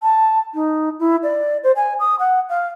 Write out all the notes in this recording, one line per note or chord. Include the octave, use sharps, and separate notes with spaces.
A5
D#4
E4
D5
C5
G#5
D#6
F#5
F5